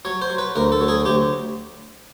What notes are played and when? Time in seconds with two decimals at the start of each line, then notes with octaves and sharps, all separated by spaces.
0.05 F#3 C#5
0.22 C5
0.30 F#3
0.38 B4
0.56 D2 A#4
0.72 A4
0.81 F#3
0.88 G#4
1.05 D2 G4